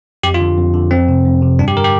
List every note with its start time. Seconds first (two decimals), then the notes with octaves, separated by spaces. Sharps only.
0.23 F2 G4
0.34 F4
0.40 D3
0.58 F2
0.74 D3
0.91 F2 C4
1.08 C3
1.25 F2
1.42 C3
1.59 G2 D4
1.68 G4
1.76 D3 A#4
1.84 G4